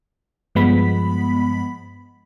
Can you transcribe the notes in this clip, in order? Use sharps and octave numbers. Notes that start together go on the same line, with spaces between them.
G2 F3 G#3 B3 B5 B6